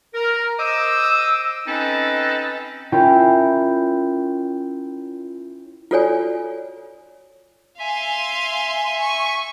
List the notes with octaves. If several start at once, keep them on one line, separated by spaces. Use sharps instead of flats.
A#4
C5 D#5 D6 E6
C4 C#4 D#4 A4 B4 D#5
C#4 E4 F4 A#4 G5
F4 F#4 A4 C#5 D5 G#5
E5 F5 G#5 C6
C#6